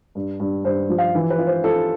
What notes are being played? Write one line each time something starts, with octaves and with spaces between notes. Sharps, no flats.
G2
G2
G2 C5
F3
F5
E3
B4
F4
C5
F4 A4